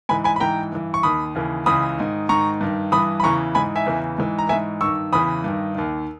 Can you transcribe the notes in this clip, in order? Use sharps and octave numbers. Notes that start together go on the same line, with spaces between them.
G#2 E3 G#5 B5
G#5 B5
B5
G#2 E3 G5 A#5
G2 E3
C#6
D#2 D#3 B5 D#6
D#2 C#3 E3
C#2 C#3 E3 B5 D#6
G#2 D#3
G#2 D#3 A#5 C#6
G2 D#3
G2 E3 B5 D#6
B5
E2 C#3 E3 A#5 C#6
G#2 E3 G#5 B5
E5 G#5
E2 C#3 E3
G#2 E3
A#5
G#2 E3 E5 G#5
G2 D#3 C#6 E6
E2 C#3 E3 B5 D#6
G2 D#3
D#2 D#3